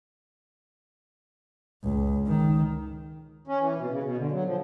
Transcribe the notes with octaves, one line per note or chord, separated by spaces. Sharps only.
C#2
D#3
C#4
E3
B2
C#3
B2
D3
F#3
F3